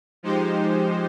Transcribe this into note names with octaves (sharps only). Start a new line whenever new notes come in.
F3 G#3 D#4 G4 C5